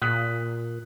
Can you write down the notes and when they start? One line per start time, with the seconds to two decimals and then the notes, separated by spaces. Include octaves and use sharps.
0.02 A#2 D#6 F#6 B6